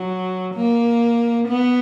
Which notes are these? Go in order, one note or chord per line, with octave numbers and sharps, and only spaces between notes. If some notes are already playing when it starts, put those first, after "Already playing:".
Already playing: F#3
A#3
B3